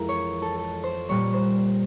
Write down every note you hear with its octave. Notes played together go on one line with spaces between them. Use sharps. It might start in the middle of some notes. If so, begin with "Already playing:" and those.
Already playing: F2 E3 G#3 A#4
C#5
A4
A4
C5
A#2 G3 A#3 C#5
C5